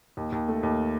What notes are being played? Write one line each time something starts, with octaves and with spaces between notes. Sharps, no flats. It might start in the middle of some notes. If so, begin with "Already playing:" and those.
D#2
D#2
A3
D#2